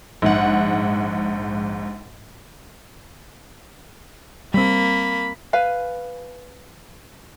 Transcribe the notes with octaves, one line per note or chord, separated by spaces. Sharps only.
A#1 G#2 F#5
G3 A#3 C4 B5
B4 F5 G#5